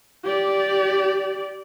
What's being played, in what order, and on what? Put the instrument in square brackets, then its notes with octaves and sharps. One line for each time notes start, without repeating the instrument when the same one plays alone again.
[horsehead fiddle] G4 D5